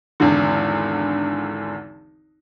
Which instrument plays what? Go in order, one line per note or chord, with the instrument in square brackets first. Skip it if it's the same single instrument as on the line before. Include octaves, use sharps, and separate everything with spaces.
[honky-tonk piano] G#1 E2 D3